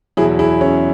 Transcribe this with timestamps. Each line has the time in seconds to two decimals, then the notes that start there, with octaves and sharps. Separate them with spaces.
0.17 E2 B2 F#3 E4 G#4
0.39 E4 G#4
0.61 C#4 E4